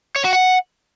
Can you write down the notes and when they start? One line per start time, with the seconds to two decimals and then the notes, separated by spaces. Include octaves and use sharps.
0.16 C#5
0.24 F#4
0.33 F#5